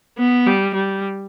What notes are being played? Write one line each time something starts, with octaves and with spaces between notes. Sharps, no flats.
B3
G3
G3